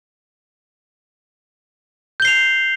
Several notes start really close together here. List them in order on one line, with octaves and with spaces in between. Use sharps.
G6 G7 C7 F7